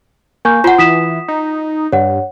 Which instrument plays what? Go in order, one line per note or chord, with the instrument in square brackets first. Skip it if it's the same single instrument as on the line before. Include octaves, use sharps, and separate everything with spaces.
[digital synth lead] A#3 [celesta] G#5 C#6 G6
[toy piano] F4 F#5 [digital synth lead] C5
[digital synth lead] E3 [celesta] D#6 B6 E7
[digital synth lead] D#4
[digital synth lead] G2 [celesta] C#5 F#5